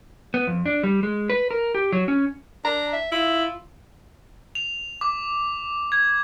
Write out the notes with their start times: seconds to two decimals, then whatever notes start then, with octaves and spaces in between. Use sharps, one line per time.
0.34 B3
0.47 F2
0.66 D4
0.84 G3
1.03 G#3
1.30 B4
1.51 A#4
1.75 G4
1.92 F#3
2.08 C#4
2.64 D4 A#5
2.93 E5
3.12 E4 F4
4.55 F7
5.01 D6
5.92 G#6